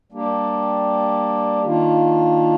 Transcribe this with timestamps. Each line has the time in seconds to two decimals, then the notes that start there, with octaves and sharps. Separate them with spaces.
0.12 G3 A#3 D4 G4
1.62 D#3 A#3 D4 F4